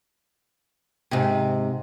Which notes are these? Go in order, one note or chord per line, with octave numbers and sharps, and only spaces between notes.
G#2 C3